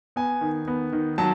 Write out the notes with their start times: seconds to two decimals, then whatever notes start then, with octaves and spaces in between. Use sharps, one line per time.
0.16 B3 G#5
0.41 D#3
0.67 B3
0.93 D#3
1.18 F#3 A5